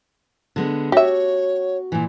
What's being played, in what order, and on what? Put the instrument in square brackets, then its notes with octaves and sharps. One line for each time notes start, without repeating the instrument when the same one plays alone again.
[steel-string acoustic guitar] D3 G#3 B3
[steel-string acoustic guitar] F#4 [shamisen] G4 E5 [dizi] C#5
[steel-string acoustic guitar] A#2 E3 [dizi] G#5